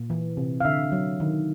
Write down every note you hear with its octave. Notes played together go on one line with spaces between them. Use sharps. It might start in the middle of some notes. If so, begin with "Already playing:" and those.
Already playing: A#2
E3
C3
F5
D3 E5
F#3
D#3